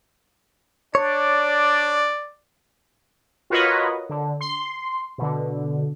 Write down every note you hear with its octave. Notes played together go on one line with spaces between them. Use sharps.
D4 C#5 D5
F4 F#4 A#4 B4 C#5 D#5
D3
C6
B2 D3